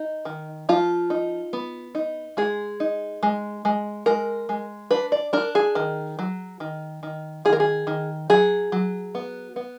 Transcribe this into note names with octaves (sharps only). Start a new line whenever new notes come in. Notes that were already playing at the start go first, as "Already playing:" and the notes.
Already playing: D#4
D#3
F3 F4
D#4
B3
D#4
G#3 G#4
D#4
G#3
G#3
G#3 A#4
G#3
D4 B4
D5
D4 A#4
G#4
D#3
F#3
D#3
D#3
D#3 G#4
A#4
G#4
D#3
F#3 G#4
F#3
B3
B3